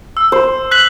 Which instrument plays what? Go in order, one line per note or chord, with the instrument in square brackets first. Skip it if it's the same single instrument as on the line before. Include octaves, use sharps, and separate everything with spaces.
[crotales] E6
[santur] C5
[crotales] F#6 B6 F#7